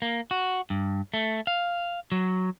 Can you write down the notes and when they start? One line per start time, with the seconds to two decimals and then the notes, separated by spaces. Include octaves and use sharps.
0.02 A#3
0.31 F#4
0.70 G2
1.14 A3
1.47 F5
2.12 F#3